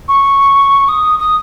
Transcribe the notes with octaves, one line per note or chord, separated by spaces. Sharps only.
C#6
D#6
D#6